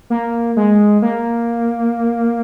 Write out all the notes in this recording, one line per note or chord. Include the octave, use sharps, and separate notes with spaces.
A#3
G#3
A#3